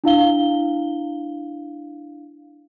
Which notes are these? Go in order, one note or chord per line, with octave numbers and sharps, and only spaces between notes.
D4 E4 F5 G7